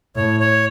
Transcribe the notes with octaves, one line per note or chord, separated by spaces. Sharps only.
A2 C#5
C#5